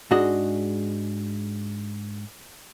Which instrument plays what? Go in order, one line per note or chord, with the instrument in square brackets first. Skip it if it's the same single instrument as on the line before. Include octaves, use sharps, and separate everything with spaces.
[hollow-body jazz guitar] G#2 G#3 D4 F#4 D#5